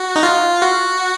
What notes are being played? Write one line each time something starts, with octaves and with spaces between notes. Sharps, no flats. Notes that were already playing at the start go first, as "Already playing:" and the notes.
Already playing: F#4
D#4
F4
F#4